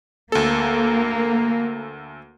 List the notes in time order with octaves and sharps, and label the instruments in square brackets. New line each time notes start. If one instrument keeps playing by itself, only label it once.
[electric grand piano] D2 A4 [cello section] A#3